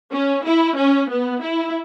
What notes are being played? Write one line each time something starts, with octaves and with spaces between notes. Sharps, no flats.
C#4
E4
C#4
B3
E4